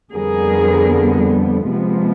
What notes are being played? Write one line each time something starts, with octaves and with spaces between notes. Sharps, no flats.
F2 D3 G3 B3 G#4 A#4
C3 F3 G#3 B3